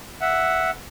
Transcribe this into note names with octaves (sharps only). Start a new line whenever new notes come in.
E5 F#5